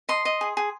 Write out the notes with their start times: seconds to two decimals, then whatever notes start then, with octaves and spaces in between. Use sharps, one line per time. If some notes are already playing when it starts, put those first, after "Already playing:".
0.09 D#5 C6
0.25 D#5
0.41 G#4
0.57 G#4